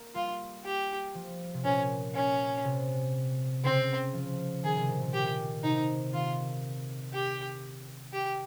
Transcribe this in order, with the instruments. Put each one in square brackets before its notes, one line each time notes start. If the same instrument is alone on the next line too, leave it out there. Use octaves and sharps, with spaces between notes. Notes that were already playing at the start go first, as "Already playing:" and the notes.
Already playing: [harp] A#3
[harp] G3 [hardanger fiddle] F4
[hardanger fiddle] G4
[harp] F3
C3
[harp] A#2 [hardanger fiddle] C#4
[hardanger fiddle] C#4
[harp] C3
[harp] C#3 [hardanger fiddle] C4
[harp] F3
[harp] D#3 [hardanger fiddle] G#4
[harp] C3
A#2
A#2
[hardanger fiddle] G4
[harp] C3 [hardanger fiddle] D#4
[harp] D#3 [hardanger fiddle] F4
[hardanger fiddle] G4
G4